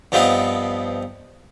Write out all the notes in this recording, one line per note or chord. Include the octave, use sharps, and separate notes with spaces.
G2 F3 B3 C4 D#4